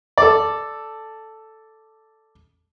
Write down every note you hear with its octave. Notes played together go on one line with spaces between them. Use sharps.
A4 D5